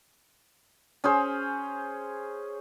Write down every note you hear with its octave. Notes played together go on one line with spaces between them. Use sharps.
C#4 G#4 C5